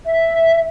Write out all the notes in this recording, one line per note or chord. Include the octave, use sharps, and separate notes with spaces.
E5